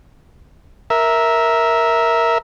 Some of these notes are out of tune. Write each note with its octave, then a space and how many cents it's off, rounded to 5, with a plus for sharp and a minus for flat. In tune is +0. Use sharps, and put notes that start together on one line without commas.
A#4 +0 E5 -15